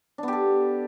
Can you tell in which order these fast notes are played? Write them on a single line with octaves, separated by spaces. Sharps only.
D4 B3 G4 A4